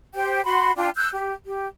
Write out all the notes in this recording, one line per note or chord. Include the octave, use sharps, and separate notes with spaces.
G4 C5 G5
F#4 B5 C6
D4 F4 G5
E6 F#6 G6
G4
G4